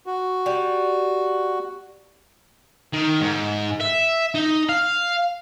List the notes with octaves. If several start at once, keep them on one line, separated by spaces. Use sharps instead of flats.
F#4
G3
D#3
G#2
E5
D#4
F5